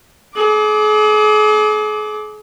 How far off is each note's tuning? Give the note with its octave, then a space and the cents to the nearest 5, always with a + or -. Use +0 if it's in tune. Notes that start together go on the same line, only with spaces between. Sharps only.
G#4 +40 D6 +0